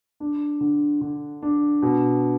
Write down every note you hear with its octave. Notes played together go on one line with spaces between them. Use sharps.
D4
D3
D3
D4
B2